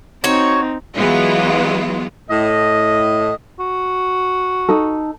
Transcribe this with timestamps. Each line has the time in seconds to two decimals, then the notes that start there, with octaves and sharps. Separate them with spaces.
0.24 C4 D#4 F#4 C#5
0.95 E3 F#3 G#3 B3 E4 F4
2.29 A2 D#5
3.60 F#4
4.69 D#4 A4